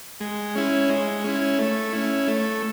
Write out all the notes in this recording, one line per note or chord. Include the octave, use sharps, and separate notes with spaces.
G#3
C#4 E4
G#3
C#4 E4
A3
C#4 E4
A3